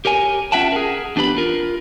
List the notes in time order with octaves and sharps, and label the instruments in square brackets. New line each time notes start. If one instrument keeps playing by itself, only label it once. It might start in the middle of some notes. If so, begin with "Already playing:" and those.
[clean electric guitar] G4 A#4 C#5 G#5
C#4 F4 E5 F#5 G5 A5
G#4 A#4
E2 D4 G4 B4 B5
F4 A#4